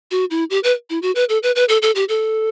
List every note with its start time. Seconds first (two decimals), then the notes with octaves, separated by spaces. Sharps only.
0.11 F#4
0.31 E4
0.50 G4
0.63 B4
0.90 E4
1.02 F#4
1.15 B4
1.29 A4
1.43 B4
1.56 B4
1.69 A4
1.82 A4
1.95 G4
2.09 A4